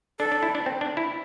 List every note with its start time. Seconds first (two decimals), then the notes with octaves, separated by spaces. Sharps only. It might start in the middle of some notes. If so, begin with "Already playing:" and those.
0.19 D4 A4
0.32 D4
0.43 E4
0.55 D4
0.66 C4
0.81 D4
0.97 E4